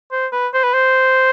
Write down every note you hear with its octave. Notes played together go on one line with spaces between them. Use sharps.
C5
B4
C5
B4
C5